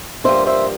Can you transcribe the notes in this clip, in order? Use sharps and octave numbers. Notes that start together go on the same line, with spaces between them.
G2 F3 A#3 D4 C5 E5
C5 E5